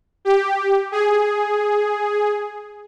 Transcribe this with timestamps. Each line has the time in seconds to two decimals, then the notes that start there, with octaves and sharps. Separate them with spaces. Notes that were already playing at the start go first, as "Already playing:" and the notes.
0.25 G4
0.92 G#4